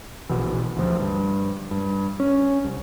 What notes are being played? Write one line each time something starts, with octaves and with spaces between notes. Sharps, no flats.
A#1 B2 E3
D2 F3
G2
G2
C#4
C2